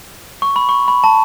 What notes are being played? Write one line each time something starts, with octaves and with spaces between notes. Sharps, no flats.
C#6
B5
C#6
B5
A5